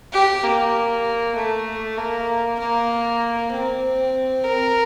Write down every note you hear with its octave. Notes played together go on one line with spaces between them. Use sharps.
G4
A#3
A3
A#3
A#3
C4
A#4